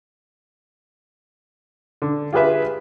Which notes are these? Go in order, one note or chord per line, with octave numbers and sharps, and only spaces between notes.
D3
F4 G4 G#4 B4 E5